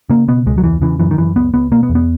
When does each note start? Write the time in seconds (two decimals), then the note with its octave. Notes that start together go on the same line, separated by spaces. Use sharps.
0.10 C#3 A#3
0.28 B2 B3
0.46 C#2 G#3
0.58 F#3
0.64 E2 E3
0.82 C#3 E3
1.00 F#2 E3
1.11 D#3
1.18 F#2 E3
1.36 C#2 B3
1.54 C#2 B3
1.71 B2 A#3
1.83 B3
1.89 E2
1.95 B3